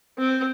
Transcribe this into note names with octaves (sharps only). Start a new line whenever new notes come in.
C4